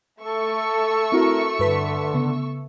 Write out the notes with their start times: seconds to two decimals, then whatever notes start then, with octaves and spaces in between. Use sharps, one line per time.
0.20 A3 A4 C#6 E6
1.12 C4 E4 F#4 A#4
1.59 G2 D3 B4 B6
2.14 C#3 B3